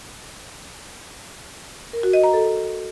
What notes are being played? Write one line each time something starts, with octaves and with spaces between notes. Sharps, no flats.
A#4
F#4
D#5
A#5
A4